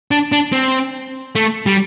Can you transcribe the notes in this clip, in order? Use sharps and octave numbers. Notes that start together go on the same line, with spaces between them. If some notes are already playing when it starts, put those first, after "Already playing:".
D4
D4
C4
A3
G3